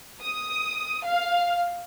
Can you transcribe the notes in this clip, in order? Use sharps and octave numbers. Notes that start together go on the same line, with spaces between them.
D#6
F5